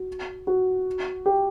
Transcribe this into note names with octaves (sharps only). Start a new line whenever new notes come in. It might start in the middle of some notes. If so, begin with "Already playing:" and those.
Already playing: F#4
F#4
G4